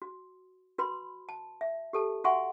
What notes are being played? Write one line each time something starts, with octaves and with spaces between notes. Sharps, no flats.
F#4
F#4 B4 B5 C6
A5
E5
G4 A4 A5
F#4 E5 F#5 G#5 C6 C#6